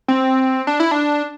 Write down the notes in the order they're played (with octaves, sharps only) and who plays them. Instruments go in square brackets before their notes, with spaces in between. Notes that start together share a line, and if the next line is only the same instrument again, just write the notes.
[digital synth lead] C4
D4
E4
D4